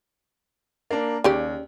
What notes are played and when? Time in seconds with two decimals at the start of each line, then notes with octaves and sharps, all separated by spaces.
0.91 A#3 D4
1.24 D#2 C#3 G4 D5